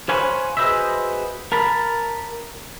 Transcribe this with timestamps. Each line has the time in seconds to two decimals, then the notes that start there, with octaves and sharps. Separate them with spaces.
0.09 C5 C#5 F5 F#5 G#5 B5
0.57 F#4 G#4 B4 C5 D#5 E5
1.52 A#4 A5 B5